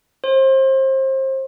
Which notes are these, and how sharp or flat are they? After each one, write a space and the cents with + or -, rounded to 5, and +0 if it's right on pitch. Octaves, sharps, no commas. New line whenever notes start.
C5 +30